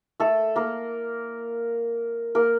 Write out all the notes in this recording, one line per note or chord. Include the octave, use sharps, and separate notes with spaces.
A3 A4
A#3 A#4
A#3 A#4